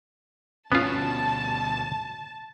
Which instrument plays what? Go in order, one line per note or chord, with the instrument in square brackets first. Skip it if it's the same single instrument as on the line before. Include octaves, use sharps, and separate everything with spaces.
[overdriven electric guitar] D2 B2 [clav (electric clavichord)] B3 F4 [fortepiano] C#4 [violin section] A5